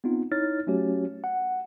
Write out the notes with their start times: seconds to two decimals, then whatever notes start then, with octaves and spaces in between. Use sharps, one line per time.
0.04 B3 C4 D#4 F4
0.32 D#4 E4 C#5 F6 A6
0.67 F#3 A3 C#4 F#4 G4 C#5
1.24 F#5